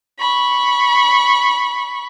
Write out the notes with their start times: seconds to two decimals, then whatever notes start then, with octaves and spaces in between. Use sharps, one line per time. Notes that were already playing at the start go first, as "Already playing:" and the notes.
0.19 B5 C#6